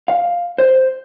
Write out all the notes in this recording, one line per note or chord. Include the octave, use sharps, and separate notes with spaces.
F5
C5